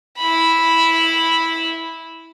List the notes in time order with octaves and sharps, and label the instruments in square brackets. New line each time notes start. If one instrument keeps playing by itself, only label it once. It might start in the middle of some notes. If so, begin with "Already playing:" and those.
[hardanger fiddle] E4 B5